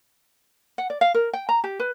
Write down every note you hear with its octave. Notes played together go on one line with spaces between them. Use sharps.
F#5
D5
F5
A#4
G5
A#5
G4
B4